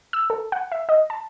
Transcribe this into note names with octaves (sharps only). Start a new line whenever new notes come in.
E6
A4
F#5
E5
D#5
A5